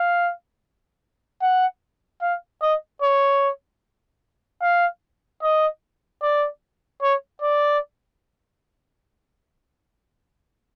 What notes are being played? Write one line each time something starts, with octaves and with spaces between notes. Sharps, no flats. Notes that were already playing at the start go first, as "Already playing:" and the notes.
Already playing: F5
F#5
F5
D#5
C#5
F5
D#5
D5
C#5
D5